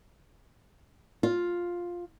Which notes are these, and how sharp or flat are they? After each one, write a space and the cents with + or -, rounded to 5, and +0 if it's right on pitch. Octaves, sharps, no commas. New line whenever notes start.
F4 +5